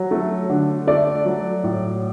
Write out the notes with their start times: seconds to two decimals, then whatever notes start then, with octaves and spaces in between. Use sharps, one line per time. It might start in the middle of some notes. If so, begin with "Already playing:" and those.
Already playing: F#3
0.11 A3
0.49 D3
0.87 A3 D5
1.25 F#3
1.64 A2